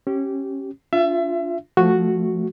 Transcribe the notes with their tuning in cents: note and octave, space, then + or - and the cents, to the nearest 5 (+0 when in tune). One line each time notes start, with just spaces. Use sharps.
C#4 -25 G4 -20
D4 -25 F4 +0 E5 +30
F3 +0 A3 +0 F#4 +0